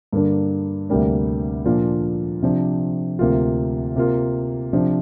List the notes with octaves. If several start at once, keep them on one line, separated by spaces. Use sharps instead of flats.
G2 D3 A#3 D4
D2 C3 G3 A#3 D4
A#2 F3 D4 F4
C3 F3 D4
D2 C3 A#3 F4
C3 A#3 F4
C3 F3 D4